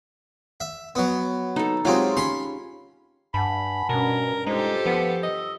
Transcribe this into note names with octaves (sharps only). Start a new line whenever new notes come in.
E5
F#3 B3
D#4 A4
F#3 G#3 C4 F4 G4
C#4 B5 C6
G2 F#5 G#5 A5 B5
G2 B2 C#4 A#4
G#3 D#4 F4 G4 A4 C5
F3 B3
D#5 E6